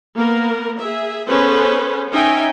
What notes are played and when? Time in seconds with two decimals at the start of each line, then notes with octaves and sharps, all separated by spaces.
0.14 A#3 B3 A#4
0.77 G#4 E5
1.28 B3 C#4 G#4 A4 B4 C5
2.11 C#4 D#4 E5 G5 G#5